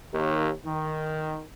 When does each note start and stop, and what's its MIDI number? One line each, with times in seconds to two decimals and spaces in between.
0.14 0.50 39
0.66 1.42 51